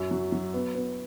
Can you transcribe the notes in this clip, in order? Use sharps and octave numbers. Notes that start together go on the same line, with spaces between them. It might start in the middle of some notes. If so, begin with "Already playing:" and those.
Already playing: F#2
F#3
F#3
B3
B3